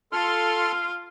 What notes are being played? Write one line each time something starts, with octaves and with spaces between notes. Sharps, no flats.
F4 A4 F5 C6 F6